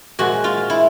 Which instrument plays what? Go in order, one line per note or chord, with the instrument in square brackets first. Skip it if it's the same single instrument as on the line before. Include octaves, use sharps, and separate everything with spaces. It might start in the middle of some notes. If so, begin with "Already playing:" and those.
[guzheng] A#2 F3 G#3 F#4
F4
E4